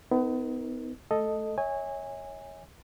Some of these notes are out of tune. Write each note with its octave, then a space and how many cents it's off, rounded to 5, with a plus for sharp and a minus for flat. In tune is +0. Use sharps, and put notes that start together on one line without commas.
B3 +35 D#4 +25 A#4 +0
A3 -20 A4 +0 D#5 +0
C#5 +0 E5 -45 G#5 -20